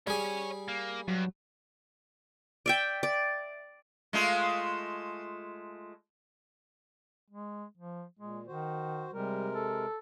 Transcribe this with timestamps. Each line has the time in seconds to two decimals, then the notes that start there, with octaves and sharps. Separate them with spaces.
0.07 G3 G#4 C#5 G#5
0.68 A#3
1.08 G2 F#3
2.66 D5 E5 G5
3.03 D5
4.13 G#3 A3 F4
7.31 G#3
7.78 F3
8.20 A#2 G#3
8.47 D#3 F#4 C5
9.13 C3 G3 G#3 A#4
9.54 A4